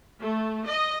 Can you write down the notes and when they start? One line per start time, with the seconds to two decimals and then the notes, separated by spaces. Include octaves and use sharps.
0.21 A3
0.67 D#5